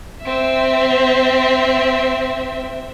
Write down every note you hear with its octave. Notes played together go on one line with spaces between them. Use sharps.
C4 E5